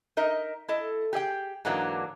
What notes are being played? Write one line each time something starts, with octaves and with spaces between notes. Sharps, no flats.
D#4 A#4 D#5 E5
E4 A4 D#5
G4 G#4 D#5 G5
G#2 D3 E3 F#3 A#3 D4